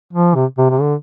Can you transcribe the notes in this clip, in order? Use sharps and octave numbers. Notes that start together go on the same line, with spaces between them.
F3
C3
C3
C3
D3